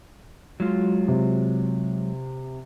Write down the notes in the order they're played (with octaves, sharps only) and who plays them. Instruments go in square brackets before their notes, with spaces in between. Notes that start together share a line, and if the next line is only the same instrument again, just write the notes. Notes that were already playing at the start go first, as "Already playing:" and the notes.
[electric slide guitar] F#3 G#3 F4
[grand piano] C3